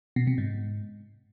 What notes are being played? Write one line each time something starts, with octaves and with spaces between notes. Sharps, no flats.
B2
C3
G#2